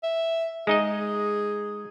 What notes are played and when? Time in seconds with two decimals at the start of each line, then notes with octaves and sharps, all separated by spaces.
0.03 E5
0.67 G#3 D#4 G#4 D#5